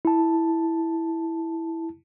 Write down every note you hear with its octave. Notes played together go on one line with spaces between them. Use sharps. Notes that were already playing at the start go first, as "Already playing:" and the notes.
E4 A5